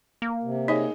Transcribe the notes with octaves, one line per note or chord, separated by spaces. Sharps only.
A#3
C3
D#4 G#4 C#5 D#5